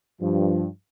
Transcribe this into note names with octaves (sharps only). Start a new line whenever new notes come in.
G2 F3